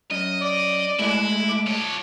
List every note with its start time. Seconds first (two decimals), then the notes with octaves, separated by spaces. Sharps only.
0.11 F#2 D#5
0.41 D5
0.99 G#3 A3 E4 D#5
1.49 D6
1.66 F3 C#5